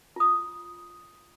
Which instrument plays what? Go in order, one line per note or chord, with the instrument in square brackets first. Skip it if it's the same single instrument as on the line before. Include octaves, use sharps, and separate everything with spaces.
[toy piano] F4 D#6